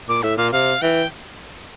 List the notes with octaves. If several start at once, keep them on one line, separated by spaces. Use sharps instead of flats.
A#2 D6
A2 E5
A#2 F5
C3 F5
E3 G5